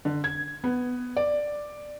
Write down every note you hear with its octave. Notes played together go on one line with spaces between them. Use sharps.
D3
G#6
B3
D5